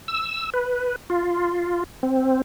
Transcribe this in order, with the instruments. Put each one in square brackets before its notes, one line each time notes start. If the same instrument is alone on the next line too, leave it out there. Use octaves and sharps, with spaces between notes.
[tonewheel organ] E6
B4
F4
C4